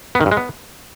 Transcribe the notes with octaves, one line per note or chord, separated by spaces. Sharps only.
B3
D#3
G2
G#3
B3